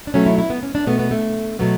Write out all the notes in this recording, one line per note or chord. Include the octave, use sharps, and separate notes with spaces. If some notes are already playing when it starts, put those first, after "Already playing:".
D4
B2 F#3 A3 C#4
E4
E4
B3
C#4
D4
B2 A3 B3
B3
A3
B2 F#3 A3 B3